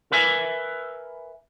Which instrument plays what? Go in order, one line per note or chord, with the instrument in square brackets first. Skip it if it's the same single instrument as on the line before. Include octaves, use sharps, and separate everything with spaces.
[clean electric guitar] A#4 B4 E5 G#5